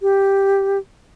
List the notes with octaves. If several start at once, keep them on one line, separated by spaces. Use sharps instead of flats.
G4